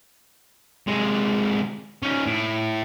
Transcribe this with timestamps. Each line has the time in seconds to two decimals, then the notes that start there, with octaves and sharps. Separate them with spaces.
0.88 C3 G#3
2.03 C#4 D#4
2.26 A2